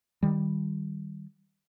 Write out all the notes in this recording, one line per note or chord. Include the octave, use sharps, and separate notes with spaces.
D#3 G3